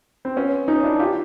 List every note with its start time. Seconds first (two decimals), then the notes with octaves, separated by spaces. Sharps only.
0.25 C4
0.36 B3 C#4
0.68 C#4 D#4
0.84 D4 E4
0.99 F4 G4